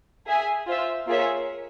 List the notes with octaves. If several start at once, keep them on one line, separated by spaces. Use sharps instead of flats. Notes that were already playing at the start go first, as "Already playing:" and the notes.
G#4 E5 G#5
F4 C5 E5
A#3 F4 G#4 C#5 E5